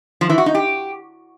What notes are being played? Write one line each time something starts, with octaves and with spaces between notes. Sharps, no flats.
F3
E3
F#4
D#4
G4